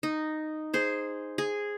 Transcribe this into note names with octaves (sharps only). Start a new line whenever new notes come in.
D#4
G#4 C5
G#4